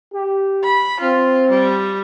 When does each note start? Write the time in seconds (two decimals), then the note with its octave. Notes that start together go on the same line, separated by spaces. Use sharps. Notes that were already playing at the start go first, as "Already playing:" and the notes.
0.12 G4
0.63 B5
1.00 C4 F4
1.50 G3